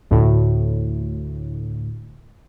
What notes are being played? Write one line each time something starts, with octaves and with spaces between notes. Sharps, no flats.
D2 A2